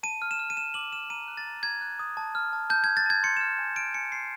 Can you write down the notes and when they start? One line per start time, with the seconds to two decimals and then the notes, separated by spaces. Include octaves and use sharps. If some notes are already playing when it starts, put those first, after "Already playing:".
0.03 A5 D#7
0.22 F6
0.31 E7
0.39 F6
0.50 D#7
0.56 A5 E7
0.74 D6 F#7
0.92 F6 E7
1.10 A#5 D#7
1.28 F#6
1.37 A6
1.46 A#5
1.63 A#5 G#6
1.81 F#6
1.99 D#6
2.17 A5
2.35 F6
2.53 A5
2.70 A5 G6
2.84 G#6
2.87 A5
2.97 A6
3.06 A5 G#6
3.23 C6 C#7
3.37 E7
3.41 F6
3.58 G#5
3.76 F6 D7
3.94 G#5 C#7
4.12 C6 C7